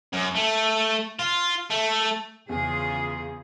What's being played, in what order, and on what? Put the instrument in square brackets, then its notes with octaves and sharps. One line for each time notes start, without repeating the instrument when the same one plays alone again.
[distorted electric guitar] F#2
A3
F4
A3
[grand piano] E2 [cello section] C#3 F4 G#4